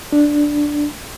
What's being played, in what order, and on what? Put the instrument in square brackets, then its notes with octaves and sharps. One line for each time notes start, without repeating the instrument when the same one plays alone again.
[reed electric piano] D4